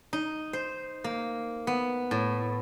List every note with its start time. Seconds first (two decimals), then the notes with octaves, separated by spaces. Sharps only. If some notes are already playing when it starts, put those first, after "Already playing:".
0.13 D#4
0.53 C5
1.04 A#3
1.67 B3
2.11 A2